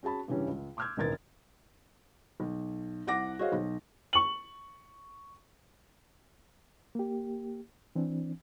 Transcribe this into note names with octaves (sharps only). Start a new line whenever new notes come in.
C#4 F#4 G#4 A5 B5
G2 C#3 E3 G3 C#4
C#2
C6 D6 E6 F6 G6 G#6
E1 A1 D#2 A#4 G#6 A6
B1
C2 F#5 D6 A#6
F#4 G#4 C5 C#5 D#5 F5
B1
C#6 F#7
A#3 G4
E3 C4 D4